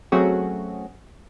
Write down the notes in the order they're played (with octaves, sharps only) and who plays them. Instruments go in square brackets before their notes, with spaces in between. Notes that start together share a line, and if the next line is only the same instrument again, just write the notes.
[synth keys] F#3 A3 C4 C#4 F#4 G#4